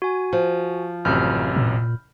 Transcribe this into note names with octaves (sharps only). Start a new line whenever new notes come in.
F#4 G#5
F3
A1 F#2 C3 B5 F6 G6
A#2